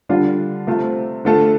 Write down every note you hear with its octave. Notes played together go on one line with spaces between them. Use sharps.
D3 G3 D4 F4
C3 A3 C4 F4
D3 A3 F4 A4